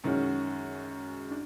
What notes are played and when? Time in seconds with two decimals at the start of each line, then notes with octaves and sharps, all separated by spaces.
0.04 F#2 D#3 G#3 C#4 F#4
1.31 D4